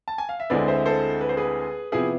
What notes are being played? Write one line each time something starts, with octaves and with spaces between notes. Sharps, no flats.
A5
G#5
F5
E5
D2 D3 G#3 C4 E4 B4 D5
C5 E5
A4 C5
B4
C5
G#4 B4
C3 F3 B3 E4 G#4 B4